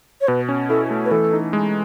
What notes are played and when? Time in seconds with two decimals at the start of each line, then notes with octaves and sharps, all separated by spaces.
0.21 C#5
0.28 B2 B4
0.49 C#4
0.69 E4 A4
0.90 A3
1.05 B4
1.11 E3 A4
1.33 D#4
1.53 G#3